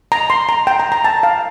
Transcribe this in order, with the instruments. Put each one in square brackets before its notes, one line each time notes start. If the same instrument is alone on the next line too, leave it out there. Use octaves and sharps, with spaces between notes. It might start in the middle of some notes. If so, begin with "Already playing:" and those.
[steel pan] A#5
C6
A#5
G5
A#5
A#5
A5
F5